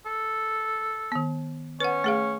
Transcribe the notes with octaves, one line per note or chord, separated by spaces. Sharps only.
A4
D#3 B3
C#4 B4 F#5
A3 G#4 F5